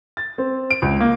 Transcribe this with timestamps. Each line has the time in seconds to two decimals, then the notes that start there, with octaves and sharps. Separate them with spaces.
0.17 A6
0.38 C4
0.70 D7
0.82 C#2
1.00 A#3